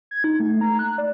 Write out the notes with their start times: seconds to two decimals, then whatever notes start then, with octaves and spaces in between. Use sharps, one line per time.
0.11 G#6
0.24 D#4
0.40 A3
0.61 A#5
0.79 F#6
0.98 D5